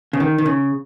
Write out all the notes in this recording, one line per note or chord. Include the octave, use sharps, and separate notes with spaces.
C#3
D#3
D#3
C#3